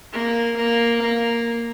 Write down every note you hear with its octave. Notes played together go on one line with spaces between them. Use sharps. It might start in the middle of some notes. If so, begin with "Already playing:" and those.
A#3
A#3
A#3